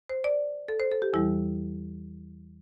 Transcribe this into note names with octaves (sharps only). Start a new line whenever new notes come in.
C5
D5
A4
C5
A4
G4
E2 E3 G3 E4